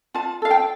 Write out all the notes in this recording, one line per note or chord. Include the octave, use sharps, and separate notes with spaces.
F4 A5
A4 F5
G5